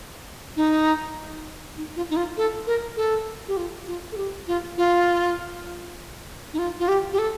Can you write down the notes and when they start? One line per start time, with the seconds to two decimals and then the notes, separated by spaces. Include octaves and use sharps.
0.56 D#4
1.77 D#4
1.96 F4
2.10 D#4
2.17 F4
2.37 A4
2.67 A#4
2.97 A4
3.48 G4
3.57 F4
3.87 F4
4.12 A4
4.17 G4
4.48 F4
4.77 F4
6.53 D#4
6.59 F4
6.79 F4
6.88 G4
7.13 G4
7.19 A4